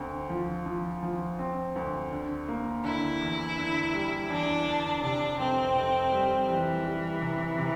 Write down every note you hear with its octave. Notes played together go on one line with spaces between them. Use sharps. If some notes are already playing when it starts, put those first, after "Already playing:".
Already playing: D2 C4
F3
F3
F3
C4
D2
D3
A#3
D3 E4
E2
D3
G3
E2 D4
D3
C3 D4
F1 C4
F1
G3
E3 G3
G3
C3
C3